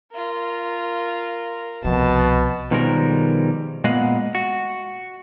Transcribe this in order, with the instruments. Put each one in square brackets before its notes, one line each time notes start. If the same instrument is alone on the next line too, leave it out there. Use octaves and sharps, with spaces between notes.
[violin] F4 A#4
[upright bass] C2 F3 [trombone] B2 [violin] A5
[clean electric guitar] B2 D#3 F3 G3 G#3 A#4
A#2 G#3 B3 D#5 F5 F#5
F#4